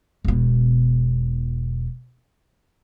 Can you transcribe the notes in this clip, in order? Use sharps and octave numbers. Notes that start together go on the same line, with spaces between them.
E1 B2